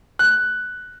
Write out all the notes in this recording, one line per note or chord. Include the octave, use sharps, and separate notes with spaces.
F#6